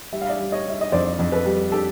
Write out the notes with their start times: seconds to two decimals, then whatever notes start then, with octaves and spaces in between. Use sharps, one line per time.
0.12 G3 E5
0.22 F5
0.29 D5 E5
0.39 G3
0.52 C#5 D#5
0.66 G3 E5
0.81 D#5
0.92 F2 C5 D5
1.19 F2
1.32 A4 B4
1.46 G3
1.72 G4 A4